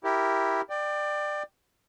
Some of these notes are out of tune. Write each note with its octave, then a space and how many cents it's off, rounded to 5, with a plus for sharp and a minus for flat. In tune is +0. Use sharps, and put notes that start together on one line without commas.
E4 +0 G4 +0 A#4 -5
D5 +25 G5 +0